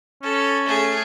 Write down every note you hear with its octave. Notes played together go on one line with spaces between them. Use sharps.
C#4 A4
A3 G#4